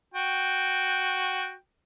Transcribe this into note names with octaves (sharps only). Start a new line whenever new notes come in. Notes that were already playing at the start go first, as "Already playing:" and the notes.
F#4 G5